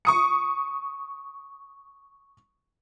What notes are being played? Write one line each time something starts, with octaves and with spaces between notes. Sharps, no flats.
C#6 D#6 C#7